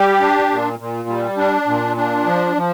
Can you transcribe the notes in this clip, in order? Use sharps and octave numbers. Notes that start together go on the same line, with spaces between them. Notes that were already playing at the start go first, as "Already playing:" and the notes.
Already playing: G3 G4
D4
A#2
A#2
G3
D4
A#2
D4
F3
F3